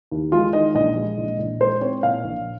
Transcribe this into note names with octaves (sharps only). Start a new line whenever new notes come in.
D#2
G#3 F4
D#3 D#5
A#1 D#5
G#3
A#1
A#1
G#3 C5
C4 C#5
A#2 F5
A#1